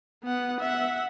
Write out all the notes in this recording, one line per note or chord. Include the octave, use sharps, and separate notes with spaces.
B3 F#5
E5 F#5